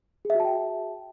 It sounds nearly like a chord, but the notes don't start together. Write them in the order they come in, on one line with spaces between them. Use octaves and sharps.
G#4 E5 F#4 A5 G5